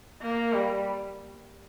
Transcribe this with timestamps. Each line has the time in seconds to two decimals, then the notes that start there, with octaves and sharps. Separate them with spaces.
0.21 A#3
0.53 G3